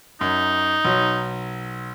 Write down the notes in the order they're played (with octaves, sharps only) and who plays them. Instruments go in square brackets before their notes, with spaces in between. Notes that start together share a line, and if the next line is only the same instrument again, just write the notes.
[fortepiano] F#2 [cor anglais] D#4
[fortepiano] B1 F#3